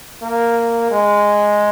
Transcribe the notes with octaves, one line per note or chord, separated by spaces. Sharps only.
A#3
G#3